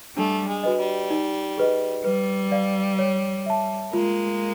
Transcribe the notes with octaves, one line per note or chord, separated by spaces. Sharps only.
G3 A3 D4
G#3
F#4 B4 D#5
G3
D#4
G#4 B4 D#5
G3 B4
D5 F5
C#5
E5 A5
G#3 A#3 F4